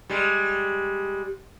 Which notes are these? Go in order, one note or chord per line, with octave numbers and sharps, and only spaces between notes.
G3 G#3